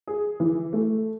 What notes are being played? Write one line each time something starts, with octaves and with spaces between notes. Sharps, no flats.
G#4
E3
A3